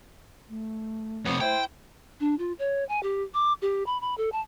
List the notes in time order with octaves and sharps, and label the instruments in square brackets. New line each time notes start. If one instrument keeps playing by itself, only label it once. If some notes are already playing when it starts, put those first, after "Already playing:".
[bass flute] A3
[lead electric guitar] F2 C3 [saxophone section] B3 C#5
[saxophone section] E4 C5 [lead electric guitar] G5
[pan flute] D4
F4
C#5
G#5
G4
D6
G4
B5
B5
A4
A5